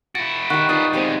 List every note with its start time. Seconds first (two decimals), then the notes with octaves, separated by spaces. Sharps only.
0.15 E4 F#4 A6 D7
0.50 D#3 G4 F#5 C#6 F#6
0.69 G3 D#4 F4 B4 D#6 A6
0.93 E2 G#3 C4 G4 F5